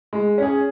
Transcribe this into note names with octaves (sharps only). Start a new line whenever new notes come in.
G#3
C#4 G#4